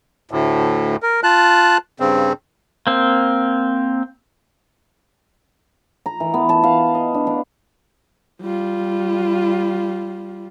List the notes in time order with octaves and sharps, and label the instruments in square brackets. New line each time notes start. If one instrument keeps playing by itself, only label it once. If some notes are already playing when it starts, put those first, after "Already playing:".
[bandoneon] D2 A2
A#4
F4 A5 F#6
G2 C#3 C4
[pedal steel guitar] A#3 C4
[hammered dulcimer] A#5
E3
B3
A5
F5
D#5
D4
D4
[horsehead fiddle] G3 F4